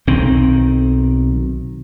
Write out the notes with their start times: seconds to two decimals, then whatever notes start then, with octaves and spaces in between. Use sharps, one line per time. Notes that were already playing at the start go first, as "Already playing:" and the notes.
0.07 B1 D#3 C4